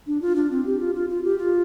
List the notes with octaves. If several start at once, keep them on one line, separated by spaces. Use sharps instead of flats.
D4
F4
D4
C4
G4
F4
F4
F4
G4
F4